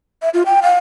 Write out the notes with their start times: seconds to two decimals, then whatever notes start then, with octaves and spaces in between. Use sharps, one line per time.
0.22 E5
0.34 F4
0.46 G5
0.63 F5